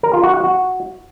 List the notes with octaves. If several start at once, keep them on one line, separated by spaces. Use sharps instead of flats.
A#4
F4
F#4
F#5
F#4